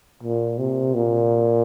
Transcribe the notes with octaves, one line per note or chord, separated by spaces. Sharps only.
A#2
C3
A#2